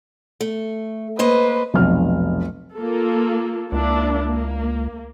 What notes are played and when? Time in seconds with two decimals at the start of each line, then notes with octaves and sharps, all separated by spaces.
0.41 A3
1.19 A#3 B4 C5 D#5
1.74 F1 B1 F6
2.76 A#3 F4 A4
3.72 C#2 A#3 D4 E4
4.26 A#3